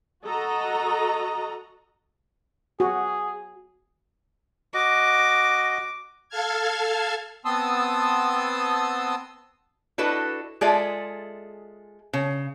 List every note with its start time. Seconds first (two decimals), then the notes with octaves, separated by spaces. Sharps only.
0.24 F#4 A4 D#5 A#5
2.80 F#4 G#4
4.74 F#4 D#5 D6
6.29 A4 F5 A5 F6 G#6
7.45 B3 C4 A5 C6 D#6 E6
9.98 D4 E4 F#4 A4 B4 D#5
10.61 G#3 F4 G#4 A4 D5 E5
12.13 C#3